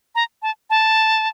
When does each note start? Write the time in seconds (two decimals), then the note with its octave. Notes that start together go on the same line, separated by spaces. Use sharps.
0.15 A#5
0.42 A5
0.70 A5